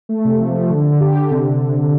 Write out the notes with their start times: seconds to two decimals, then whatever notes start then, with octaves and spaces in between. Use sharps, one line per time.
0.09 A3
0.25 C3
0.40 F3
0.55 A3
0.70 D3
0.85 D3
1.01 G4
1.16 D3
1.31 C3